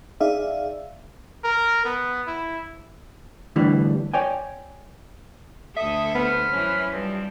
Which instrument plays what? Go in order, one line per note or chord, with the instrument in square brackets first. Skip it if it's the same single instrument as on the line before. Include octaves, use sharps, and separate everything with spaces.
[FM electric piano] D#4 G#4 D5 E5 F5
[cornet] A#4
B3
E4
[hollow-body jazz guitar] A2 D3 E3 G3
C#5 D5 G5 G#5
[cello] D2 A4 [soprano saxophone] E5 [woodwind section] D#6
[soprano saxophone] B3 [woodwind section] C5 B5 F6
[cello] F#2 E3 [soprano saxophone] C#4
[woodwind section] G2 F3 C4 [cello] G3